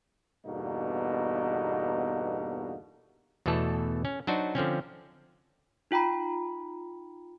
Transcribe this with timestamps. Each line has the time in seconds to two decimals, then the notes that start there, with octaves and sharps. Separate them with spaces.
0.46 E2 G2 B2 D3 A#3 D#4
3.46 E2 B2 E3 A3 A4
4.05 C#4
4.27 F#3 D4 D#4 F#4 C5
4.55 D3 F3 C4 C#4
5.91 D#4 F4 G5 A#5 B5